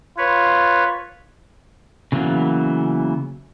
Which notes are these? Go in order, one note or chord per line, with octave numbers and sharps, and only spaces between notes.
F4 B4 C#5
C#3 E3 F#3 A#3 B3